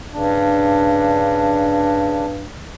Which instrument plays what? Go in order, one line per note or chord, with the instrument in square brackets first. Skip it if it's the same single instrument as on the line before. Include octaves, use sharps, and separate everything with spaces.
[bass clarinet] G2 [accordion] C#3 D4